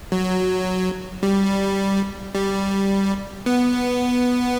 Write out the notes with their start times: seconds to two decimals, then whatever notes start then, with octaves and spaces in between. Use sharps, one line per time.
0.12 F#3
1.23 G3
2.35 G3
3.46 B3